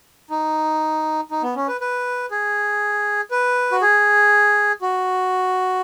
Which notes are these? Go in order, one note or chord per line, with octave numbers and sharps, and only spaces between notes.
D#4
D#4
B3
C#4
B4
B4
G#4
B4
F#4
G#4
F#4